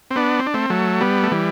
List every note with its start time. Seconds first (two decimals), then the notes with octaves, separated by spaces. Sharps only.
0.11 C4
0.16 B3 D4
0.39 C4
0.47 D4
0.54 A3 C4
0.70 F#3 A3
1.01 G3 B3
1.23 A3
1.31 E3 G3